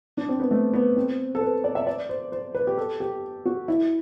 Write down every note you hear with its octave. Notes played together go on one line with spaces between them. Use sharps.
D4
C4
B3
A3
B3
C4
A4
B4
D5
E5
D5
C5
C5
B4
G4
A4
G4
F#4
E4